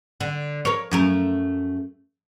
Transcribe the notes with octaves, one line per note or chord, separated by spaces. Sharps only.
D3
A#4 C#5
F#2 A3 A#4